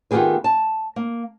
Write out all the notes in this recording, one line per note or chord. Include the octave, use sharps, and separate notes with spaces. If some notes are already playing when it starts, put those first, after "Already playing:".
D#3 B3 F4 G4 G#4 B4
A5
A#3